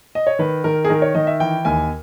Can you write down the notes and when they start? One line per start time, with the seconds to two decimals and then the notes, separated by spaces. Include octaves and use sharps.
0.15 D#5
0.27 C#5
0.39 D#3 B4
0.64 D#3 A#4
0.85 G#4
0.90 D#3 A#4
1.02 C#5
1.15 D#3 D#5
1.27 E5
1.40 E3 G5
1.65 D#2 G#5